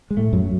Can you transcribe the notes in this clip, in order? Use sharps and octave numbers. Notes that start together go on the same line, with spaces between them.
G#3
A2 A3
F#2 F#3